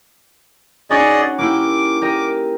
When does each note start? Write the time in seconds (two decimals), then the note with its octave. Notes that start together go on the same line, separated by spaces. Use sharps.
0.90 C#4 D#4 F#4 G#4 D5 D#5
1.38 A#3 E4 G4 D6
2.02 G4 A#4 D#5